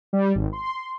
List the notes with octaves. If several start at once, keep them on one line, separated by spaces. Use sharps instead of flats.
G3
G#1
C6